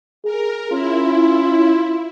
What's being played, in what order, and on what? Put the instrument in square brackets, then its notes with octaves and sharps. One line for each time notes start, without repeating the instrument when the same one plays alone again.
[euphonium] G#4 [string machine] A#4
[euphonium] C#4 [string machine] E4 [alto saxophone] F4